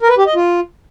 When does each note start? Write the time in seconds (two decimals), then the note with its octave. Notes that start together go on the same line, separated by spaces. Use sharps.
0.01 A#4
0.09 B4
0.18 G4
0.27 D#5
0.35 F4